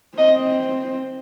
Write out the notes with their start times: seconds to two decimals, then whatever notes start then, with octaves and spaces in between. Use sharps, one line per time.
0.18 C4 D#5